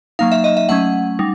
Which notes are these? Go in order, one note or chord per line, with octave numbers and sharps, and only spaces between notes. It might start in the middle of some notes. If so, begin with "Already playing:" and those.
F#3 A#3 D#4 F5
E5
D#5
E5
F#3 A3 C#4 F#5
G3 D#4